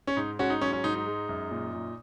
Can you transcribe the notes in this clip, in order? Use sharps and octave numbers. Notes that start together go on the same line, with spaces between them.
C#4
G#2 D#4
G#2 C#4 F#4
D#4
F#3 C#4
C#4
G#2 D#4
D#4
G#3
F#2
A#2
A#2